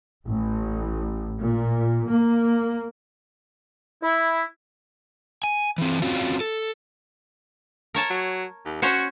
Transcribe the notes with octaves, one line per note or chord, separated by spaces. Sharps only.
A1
A#2
A#3
E4
G#5
E3 C4
C4 C#4 F4 F#4
A4
A#4 C#5 A5
F#3
D#2
C#4 F#4 C5 C#5